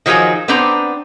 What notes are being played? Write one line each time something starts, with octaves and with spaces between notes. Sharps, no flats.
D#3 F3 F#3 D#4 G#4
B3 C4 D4 C5 A#5